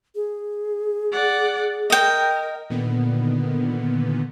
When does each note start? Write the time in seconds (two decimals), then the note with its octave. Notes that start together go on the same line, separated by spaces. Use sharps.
0.15 G#4
1.12 D5 F#5
1.90 A#4 D#5 G5
2.70 A#2 D3 D#3 B3